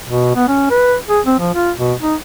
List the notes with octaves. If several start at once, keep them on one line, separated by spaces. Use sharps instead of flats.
B2
B3
C#4
B4
G#4
C4
F3
F4
B2
D#4